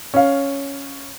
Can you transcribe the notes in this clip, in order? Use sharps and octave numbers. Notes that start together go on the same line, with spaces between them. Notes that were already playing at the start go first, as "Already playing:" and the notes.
C#4 F5